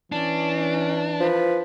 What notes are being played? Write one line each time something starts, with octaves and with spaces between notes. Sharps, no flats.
E3 C#4 D4
F3 B4